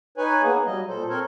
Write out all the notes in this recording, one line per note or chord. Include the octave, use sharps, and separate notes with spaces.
D#4 B4 C#5 G#5
A#3 B3 G#4
F#3 G3 D#5
A#2 A4 C5
C4 A4 A#4 C5 C#5